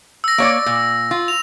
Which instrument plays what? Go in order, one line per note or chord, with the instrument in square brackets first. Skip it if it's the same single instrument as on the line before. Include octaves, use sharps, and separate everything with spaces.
[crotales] E6 A#6
[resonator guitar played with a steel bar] A#3 C#5 D5
A#2
F4
[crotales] F7